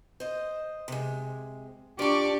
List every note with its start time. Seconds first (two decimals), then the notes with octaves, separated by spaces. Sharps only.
0.20 C5 D#5
0.88 C3 G#3
1.99 D4 F4 G4 D5 A5 C#6